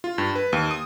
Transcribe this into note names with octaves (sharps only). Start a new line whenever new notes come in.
F4
G2
B4
D#2
D#6